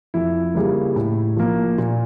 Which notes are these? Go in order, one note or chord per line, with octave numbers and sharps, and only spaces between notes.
F2 E4
C#3 G3 A#3
A2
F3 A#3
A#2